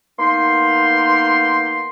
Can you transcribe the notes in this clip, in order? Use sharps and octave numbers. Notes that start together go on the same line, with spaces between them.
A#3 B3 D#4 C6